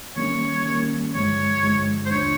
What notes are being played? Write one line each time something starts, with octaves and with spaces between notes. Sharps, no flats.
D#3 G3 A#3 C#4 C#5
D#3 G3 A#3 C#4
G2 D3 F3 G#3 C#5
G2 D3 F3 G#3
C5
D#2 D3 F3 A3 D4 C#5